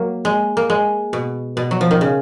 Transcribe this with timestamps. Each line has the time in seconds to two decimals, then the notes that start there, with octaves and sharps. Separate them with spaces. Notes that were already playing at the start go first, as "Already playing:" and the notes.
Already playing: F#3 A#3
0.25 G#3
0.57 A#3
0.70 G#3
1.13 B2
1.57 B2
1.71 F#3
1.81 F3
1.91 D#3
2.01 C#3